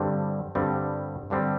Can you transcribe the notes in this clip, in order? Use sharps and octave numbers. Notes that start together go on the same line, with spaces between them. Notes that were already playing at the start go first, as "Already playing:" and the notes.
Already playing: G2 D3 G3 C4
G2 D3 G3 C4
G2 D3 G3 C4